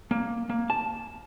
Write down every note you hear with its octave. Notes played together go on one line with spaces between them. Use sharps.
A#3
A#3
A5